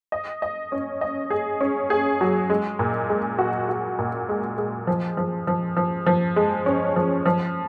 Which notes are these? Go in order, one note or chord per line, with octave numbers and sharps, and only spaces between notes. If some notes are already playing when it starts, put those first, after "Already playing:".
D#5
D#5
C#4
D#5
G#4
C#4
G#4
F#3
G#3
A#2
G#3
F#4
F#4
A#2
G#3
G#3
F3
F3
F3
F3
F3
G#3
C#4
F3
F3